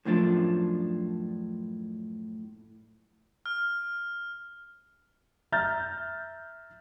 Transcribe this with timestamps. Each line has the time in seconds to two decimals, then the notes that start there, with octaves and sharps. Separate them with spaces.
0.05 F#2 A2 F3 D4
3.46 F6
5.52 E5 A#5 F6 G6 A6